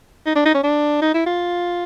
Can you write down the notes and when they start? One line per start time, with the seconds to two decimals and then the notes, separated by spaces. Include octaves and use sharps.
0.26 D#4
0.35 D4
0.45 D#4
0.54 C#4
0.63 D4
1.02 D#4
1.14 E4
1.26 F4